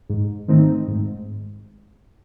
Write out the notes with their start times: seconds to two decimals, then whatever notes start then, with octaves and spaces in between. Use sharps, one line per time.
0.09 G#2
0.48 D#3 A3 C4 D#4
0.88 G#2